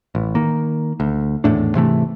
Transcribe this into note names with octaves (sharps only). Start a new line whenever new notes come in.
A1
D#3 A#3
D2
G#1 E2 A2 D4
G#2 C3 E3 A3